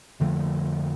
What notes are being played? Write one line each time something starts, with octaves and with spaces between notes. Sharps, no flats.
F2 D3 F3 A3